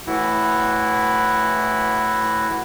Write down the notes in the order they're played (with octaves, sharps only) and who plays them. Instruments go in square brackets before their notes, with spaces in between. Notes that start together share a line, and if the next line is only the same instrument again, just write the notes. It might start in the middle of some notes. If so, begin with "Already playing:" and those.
[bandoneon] A2 E3 E4 F#4